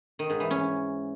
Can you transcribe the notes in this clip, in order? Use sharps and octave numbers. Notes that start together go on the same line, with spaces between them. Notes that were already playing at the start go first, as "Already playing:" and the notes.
D#3
G#2
E3
C#4